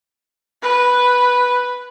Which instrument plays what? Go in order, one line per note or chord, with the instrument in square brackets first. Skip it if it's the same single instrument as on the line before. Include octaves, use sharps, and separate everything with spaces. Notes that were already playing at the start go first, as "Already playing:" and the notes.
[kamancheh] B4